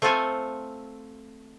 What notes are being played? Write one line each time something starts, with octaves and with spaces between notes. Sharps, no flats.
A3 C4 F4 A4 F5 G#5